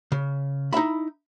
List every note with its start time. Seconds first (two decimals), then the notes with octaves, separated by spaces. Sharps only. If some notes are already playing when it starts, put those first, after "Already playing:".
0.12 C#3
0.73 D#4 E4 E5 B5